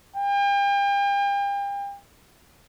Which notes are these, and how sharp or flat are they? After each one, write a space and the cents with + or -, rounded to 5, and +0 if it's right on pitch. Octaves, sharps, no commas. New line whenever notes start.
G5 +40